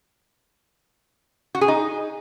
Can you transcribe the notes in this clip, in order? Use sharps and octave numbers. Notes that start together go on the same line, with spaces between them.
F#4
G#4
D#4